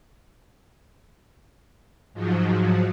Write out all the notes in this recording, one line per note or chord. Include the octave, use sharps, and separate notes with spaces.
G#2 F3 F#3